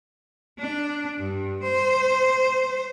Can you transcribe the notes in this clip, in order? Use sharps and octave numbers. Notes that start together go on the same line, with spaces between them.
D4
G2
C5